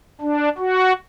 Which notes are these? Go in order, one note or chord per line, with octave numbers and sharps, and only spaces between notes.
D4
F#4